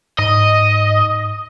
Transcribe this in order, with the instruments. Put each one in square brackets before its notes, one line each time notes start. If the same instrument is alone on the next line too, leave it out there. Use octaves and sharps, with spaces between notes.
[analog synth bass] G#2 [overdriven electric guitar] D#5